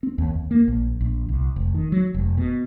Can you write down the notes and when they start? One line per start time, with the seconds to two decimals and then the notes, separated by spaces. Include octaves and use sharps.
0.03 C4
0.18 D#2
0.35 D#2
0.51 A#3
0.68 A#1
1.01 A#1
1.29 C2
1.56 F1
1.74 D#3
1.92 F#3
2.14 F1
2.37 B2